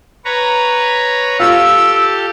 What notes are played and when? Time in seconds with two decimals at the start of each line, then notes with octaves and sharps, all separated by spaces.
0.25 B4 C#5 A#5
1.40 F4 G4 A4 E6